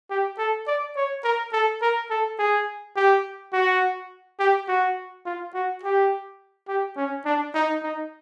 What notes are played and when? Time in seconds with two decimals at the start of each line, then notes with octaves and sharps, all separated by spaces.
0.10 G4
0.38 A4
0.67 D5
0.96 C#5
1.24 A#4
1.53 A4
1.82 A#4
2.10 A4
2.39 G#4
2.96 G4
3.53 F#4
4.39 G4
4.68 F#4
5.25 F4
5.54 F#4
5.83 G4
6.68 G4
6.97 C#4
7.25 D4
7.54 D#4
7.83 D#4